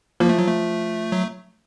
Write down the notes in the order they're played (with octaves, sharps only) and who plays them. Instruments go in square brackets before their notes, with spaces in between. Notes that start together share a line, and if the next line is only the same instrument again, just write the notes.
[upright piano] F3 [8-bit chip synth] A#3
[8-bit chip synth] A3
F#3
A3
F#3